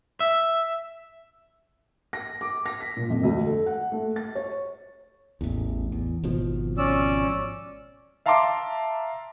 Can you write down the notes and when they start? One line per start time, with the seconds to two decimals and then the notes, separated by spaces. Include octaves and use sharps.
0.20 E5
2.13 A#6
2.41 D6
2.66 A#6
2.80 B6
2.97 A#2
3.10 F2
3.23 D2
3.46 A4
3.66 F#5
3.92 A3
4.16 A6
4.35 C#5
5.41 A1 E2
5.92 E2
6.24 G#1 B2 F3
6.78 C#4 D5 E6
8.26 E5 F5 A5 A#5 C6 D6